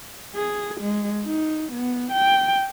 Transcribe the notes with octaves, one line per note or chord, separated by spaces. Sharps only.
G#4
G#3
D#4
B3
G5